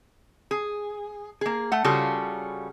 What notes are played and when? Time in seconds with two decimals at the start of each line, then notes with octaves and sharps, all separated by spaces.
0.51 G#4
1.41 A#3 G#4
1.72 A3 F#5
1.84 C#3 G3 C#4 F4 F#4 A4